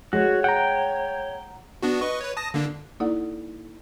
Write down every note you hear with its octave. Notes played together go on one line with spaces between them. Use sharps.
G#3 F#4 C#5
F#5 G5 A#5
B3 D4 F#4
B4 D#5 C#6
B4 C#5
A5 D#6 A#6
D3 A#3 D4
A#3 D#4 E4 A4 D5 F#5